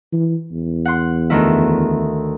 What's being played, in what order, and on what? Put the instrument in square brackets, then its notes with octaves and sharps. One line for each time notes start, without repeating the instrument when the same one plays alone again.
[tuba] E3
E2
[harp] F#5 C6
D2 D#3 E4